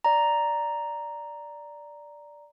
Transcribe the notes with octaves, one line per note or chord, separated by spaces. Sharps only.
D5 A#5